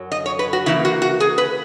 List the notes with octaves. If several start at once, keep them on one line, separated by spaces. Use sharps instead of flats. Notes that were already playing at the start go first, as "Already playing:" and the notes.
Already playing: F#2 F#3
D#5
C#5
B4
F#4
C#3 E3 A#3 E4
F#4
F#4
G#4
B4